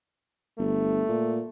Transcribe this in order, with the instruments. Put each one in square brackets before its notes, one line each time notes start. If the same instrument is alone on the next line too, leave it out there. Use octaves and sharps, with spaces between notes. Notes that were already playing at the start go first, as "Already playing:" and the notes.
[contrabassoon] G1 [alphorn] A3
[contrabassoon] A#2